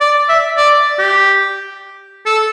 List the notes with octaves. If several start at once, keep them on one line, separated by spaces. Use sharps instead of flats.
D5
E5
D5
G4
A4